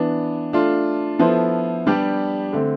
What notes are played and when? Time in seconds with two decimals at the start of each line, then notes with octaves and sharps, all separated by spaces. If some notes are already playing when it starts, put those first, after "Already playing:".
Already playing: E3 B3 D4
0.53 A3 D4 F4
1.19 F3 B3 E4 A4 C5
1.87 G3 B3 D4 G4
2.53 D3 A3 C4